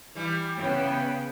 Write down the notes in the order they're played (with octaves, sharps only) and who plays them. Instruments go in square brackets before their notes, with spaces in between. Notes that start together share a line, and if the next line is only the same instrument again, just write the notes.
[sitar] E3 G3
[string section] C#3 B3 [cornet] G5